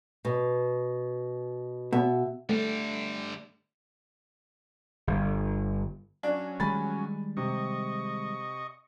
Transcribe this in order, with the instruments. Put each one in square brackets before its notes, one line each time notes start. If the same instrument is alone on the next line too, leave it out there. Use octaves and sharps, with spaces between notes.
[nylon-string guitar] B2
[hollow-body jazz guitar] B2 [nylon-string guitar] E5
[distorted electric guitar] D3 G3 [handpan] A3
[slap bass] G1
[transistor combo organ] F#3 C#4 [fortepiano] D4
[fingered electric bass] D#3 G3 G#3 [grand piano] G#5 B5 A6
[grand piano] C3 [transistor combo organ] D#5 C#6